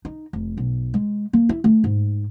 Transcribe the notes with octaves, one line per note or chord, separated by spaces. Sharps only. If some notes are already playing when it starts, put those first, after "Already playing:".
D#4
F1
B1
G#3
A#3
E4
A3
G#2